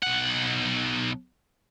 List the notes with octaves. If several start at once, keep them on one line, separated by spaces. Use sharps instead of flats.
B1 F#5